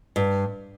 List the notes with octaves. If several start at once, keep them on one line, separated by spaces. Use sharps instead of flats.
G2